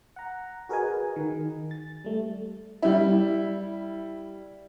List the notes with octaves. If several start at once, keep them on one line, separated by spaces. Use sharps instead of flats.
F#5 A#5
F#4 G#4 A#4 B4 D#5 G#5
D#3
A6
G3 A3
G3 E4